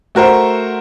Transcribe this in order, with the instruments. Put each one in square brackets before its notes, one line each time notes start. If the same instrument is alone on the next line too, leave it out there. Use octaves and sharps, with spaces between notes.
[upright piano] A3 F#4 A#4 C5